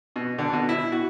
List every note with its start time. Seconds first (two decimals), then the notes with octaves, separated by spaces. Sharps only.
0.16 B2
0.38 D3
0.53 B2
0.69 E4
0.92 F#4